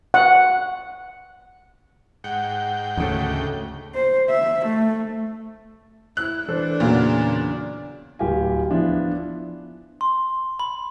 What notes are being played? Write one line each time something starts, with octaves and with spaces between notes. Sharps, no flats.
F#5
G#2 F#5 G5
D2 C#3 A3 D4
C5
E5
A3
E4 F#6
E3 D4 A4 C5
E2 A#2 C#3 F#3
D1 G4 F5 G#5
F3 B3 D4 E4 F4
C6
B5